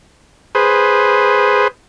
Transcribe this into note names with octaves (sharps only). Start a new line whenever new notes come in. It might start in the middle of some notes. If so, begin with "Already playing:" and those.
G#4 B4 C5